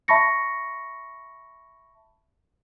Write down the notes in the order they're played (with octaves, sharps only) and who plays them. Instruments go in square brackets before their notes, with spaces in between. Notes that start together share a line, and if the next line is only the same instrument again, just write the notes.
[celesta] E5 A5 B5 C#6 A#6 C#7